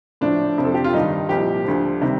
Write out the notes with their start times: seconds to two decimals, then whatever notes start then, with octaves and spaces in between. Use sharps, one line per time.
0.21 A2 F3 D4
0.58 F2 C3 F3
0.65 A4
0.74 G4
0.84 F4
0.93 G2 D#3 G3 D#4
1.29 C2 A#2 F3 G4
1.65 D2 D3 F3
2.02 C3 D#3 G3